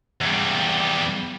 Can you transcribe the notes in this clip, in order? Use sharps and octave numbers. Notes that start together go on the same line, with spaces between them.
E2 G3